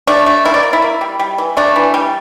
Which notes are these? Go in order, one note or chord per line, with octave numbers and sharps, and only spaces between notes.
A3 D4
A3
A#3 E4
D5
A#3
E4
A#3
G3
G3
E3
A3 D4
E3
G3